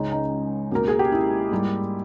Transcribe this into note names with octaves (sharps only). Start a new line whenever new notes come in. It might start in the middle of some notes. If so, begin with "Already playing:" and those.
Already playing: C#2 C#3 G#3 D#4
D#4
C#2 B2 A#3 A#4
G#4
G4
E4
G#2 G3 A#3